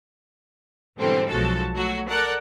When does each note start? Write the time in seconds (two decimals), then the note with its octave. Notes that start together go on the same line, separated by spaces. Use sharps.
0.97 G#2 B2 D3 E3 G3 C4
1.29 B1 F3 G#3 F#4 A4 A5
1.75 F#3 A3 F#4
2.08 A4 A#4 D5 F#5 A5 F#6